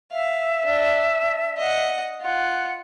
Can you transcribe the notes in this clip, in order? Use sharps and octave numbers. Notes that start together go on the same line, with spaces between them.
E5 F5
D4
D#5 F#5
F4 F#5